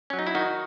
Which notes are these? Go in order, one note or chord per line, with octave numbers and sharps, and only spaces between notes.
C#4
F#3
D#4
E4
D#3 D#4 F#4